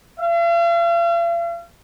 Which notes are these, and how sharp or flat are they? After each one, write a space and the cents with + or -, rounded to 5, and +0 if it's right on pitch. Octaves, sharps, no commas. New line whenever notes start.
F5 -45